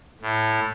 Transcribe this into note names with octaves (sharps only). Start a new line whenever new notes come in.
A2